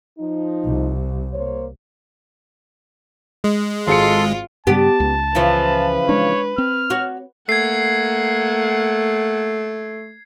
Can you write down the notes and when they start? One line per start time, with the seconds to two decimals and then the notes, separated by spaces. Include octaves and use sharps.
0.19 F3 D#4
0.65 C2
1.34 A#3 C5 C#5
3.44 G#3
3.87 G#1 F4 G#4 A4 C6 C#7
4.67 G2 C#3 G3 B3 G4 A5
5.00 C#2
5.35 C#3 E3 F3 B4
6.09 G#3 D4 C#5
6.58 C4 F6
6.90 F#4 C#5
7.49 A3 A#3 F#5 G#6 C7